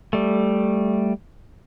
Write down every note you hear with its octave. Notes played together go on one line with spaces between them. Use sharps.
G3 A3